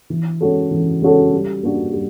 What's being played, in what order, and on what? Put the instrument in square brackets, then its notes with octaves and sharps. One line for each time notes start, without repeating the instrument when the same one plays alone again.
[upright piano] E3
G#3 C#4 F#4 A4
E3
G#3 C#4 F#4 A4
G3
A#3 D4 F#4
G3